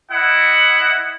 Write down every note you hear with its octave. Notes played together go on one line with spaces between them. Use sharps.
E4 D#5 F#5